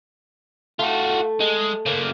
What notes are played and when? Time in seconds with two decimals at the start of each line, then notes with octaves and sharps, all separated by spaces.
0.79 A3 F4 F#4
1.41 G#3
1.86 C#3 A#3